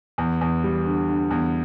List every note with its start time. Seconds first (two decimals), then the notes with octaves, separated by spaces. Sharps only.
0.18 E2
0.41 E2
0.64 G3
0.86 D3
1.08 D3
1.30 E2